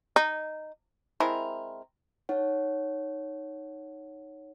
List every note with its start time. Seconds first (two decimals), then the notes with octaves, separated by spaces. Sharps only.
0.16 D#4
1.20 G#3 C4 E4 A#4
2.29 D#4 C#5 F#5